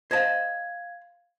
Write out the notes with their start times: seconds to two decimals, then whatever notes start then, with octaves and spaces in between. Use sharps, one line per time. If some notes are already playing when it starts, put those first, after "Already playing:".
0.11 C5 D#5 F5 A5 G#6